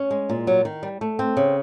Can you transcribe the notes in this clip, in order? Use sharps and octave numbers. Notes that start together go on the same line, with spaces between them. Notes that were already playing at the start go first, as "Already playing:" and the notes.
Already playing: C#4
G#3
A#2
F#3
D#3
G3
A3
C4
C#3